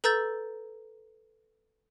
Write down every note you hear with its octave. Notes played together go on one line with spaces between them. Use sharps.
A4 B4 A#5 E6 G6 A6